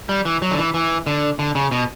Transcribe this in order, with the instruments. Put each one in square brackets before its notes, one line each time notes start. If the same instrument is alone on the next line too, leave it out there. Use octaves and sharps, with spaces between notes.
[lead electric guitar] G3
E3
F#3
D3
E3
E3
D3
D3
C#3
B2